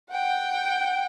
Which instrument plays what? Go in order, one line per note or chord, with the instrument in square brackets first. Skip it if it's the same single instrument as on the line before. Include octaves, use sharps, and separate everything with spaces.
[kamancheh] F#5 G5